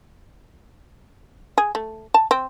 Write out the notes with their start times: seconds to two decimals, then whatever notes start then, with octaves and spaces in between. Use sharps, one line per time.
1.58 G#4
1.75 A3
2.14 A5
2.31 C4